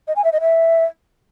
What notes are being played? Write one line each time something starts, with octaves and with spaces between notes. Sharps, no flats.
D#5
G#5
E5
D#5
E5